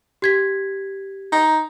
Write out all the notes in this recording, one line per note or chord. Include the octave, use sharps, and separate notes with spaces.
G4 G#6 B6
D#4